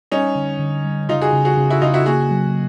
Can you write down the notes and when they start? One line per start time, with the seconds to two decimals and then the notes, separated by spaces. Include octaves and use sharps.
0.12 G3 C#4 D#4
0.36 D3
0.59 D3
0.84 G3
1.09 C#3 D#4 F4
1.21 F#4 G#4
1.33 C#3
1.45 F#4 G#4
1.57 C#3
1.70 E4 F#4
1.81 C#3 D#4 F4
1.94 E4 F#4
2.06 A#3 F#4 G#4
2.31 F#3